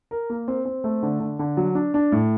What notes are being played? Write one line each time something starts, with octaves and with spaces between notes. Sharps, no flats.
A#4
A#3
C4
C4
A3
D3
D3
D3
F#3
D4
D4
A2